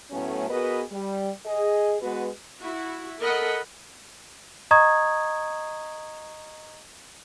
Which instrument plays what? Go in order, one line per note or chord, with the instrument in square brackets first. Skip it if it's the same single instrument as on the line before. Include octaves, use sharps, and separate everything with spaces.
[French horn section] A2 F#3 A3 B3 C#4
B3 F#4 G#4 A#4 B4 D#5
G3
G#4 D#5
G#3 B3 F#4 B4
[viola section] E4 F#4
A4 A#4 D#5 F#5 B5
[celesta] D#5 A#5 C#6 D#6 G#6